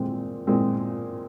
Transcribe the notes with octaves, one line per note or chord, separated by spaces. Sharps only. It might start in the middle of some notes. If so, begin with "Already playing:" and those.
Already playing: A#2 G#3 C4
A#2 G#3 C4